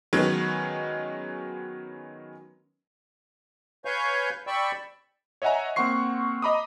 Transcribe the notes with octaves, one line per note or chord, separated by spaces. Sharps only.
D#3 F#3 G#3 B3 C#4
B4 C#5 F5 G#5 C#6 G6
D5 G5 B5 C#6 E6
C#5 D#5 E5 F#5 G#5 A#5
A#3 C4 F#5 C6 C#6 C7
D#5 A#5 B5 D6 D#6